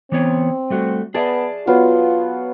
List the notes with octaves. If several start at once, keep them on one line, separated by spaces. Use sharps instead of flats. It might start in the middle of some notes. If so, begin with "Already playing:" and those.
E3 B3 C4 C#5
G3 A3 F#4
B3 G#4 D5 E5 A5
F#3 B3 F4 F5